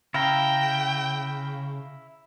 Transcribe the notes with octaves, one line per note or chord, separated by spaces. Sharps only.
C#3 E4 F5 G5 A#5